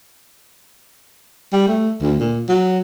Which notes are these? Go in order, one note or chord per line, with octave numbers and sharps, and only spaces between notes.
G3
A3
D2
A#2
F#3